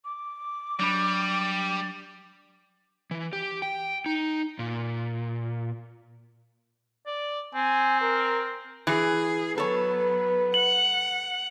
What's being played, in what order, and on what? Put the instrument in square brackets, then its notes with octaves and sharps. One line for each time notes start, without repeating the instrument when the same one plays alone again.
[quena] D6
[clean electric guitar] F#3 D4 B5 [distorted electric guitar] G3
[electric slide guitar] E3
G4
G5
D#4
A#2
[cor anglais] D5
[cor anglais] C4 [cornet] G#5
[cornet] A#4
[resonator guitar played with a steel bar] E3 [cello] G#4
[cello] F#3 B3 [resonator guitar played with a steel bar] A4 C#5 [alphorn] B4
[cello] F#5 [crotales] F#7